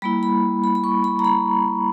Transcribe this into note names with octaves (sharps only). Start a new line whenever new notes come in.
G3 A#3 E4 B5
B5
B5
B5
C#6
B5
A#5
B5